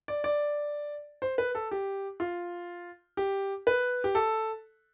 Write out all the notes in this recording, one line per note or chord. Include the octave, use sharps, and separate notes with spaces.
D5
D5
C5
B4
A4
G4
F4
G4
B4
G4
A4